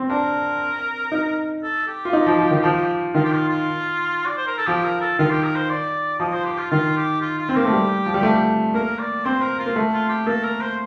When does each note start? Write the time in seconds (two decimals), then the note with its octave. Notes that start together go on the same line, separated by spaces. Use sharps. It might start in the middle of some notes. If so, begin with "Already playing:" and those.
Already playing: C4
0.10 D4 A#4
1.12 D#4
1.63 A4
1.88 G4
2.05 F4
2.13 D#4
2.26 F3
2.39 F3
2.51 D#3
2.64 F3
3.14 D#3 F4
3.25 G4
3.32 F4
3.49 F4
4.27 D5
4.37 C5
4.47 A#4
4.58 A4
4.67 F3 G4
4.85 A#4
5.02 A4
5.19 D#3 F4
5.31 G4
5.44 A#4
5.56 C5
5.70 D5
6.20 F3 D#5
6.33 C5
6.45 G4
6.58 F4
6.71 D#3 F4
6.97 G4
7.21 F4
7.39 F4
7.49 C4
7.56 A#3 G4
7.65 A3
7.72 G3
8.06 F3
8.14 G3
8.23 A3
8.74 A#3 A#4
8.99 D5
9.25 C4 C5
9.42 A#4
9.59 F4
9.66 A#3
9.76 A3
9.94 F4
10.09 G4
10.27 A#3 A4
10.44 A#4
10.61 C5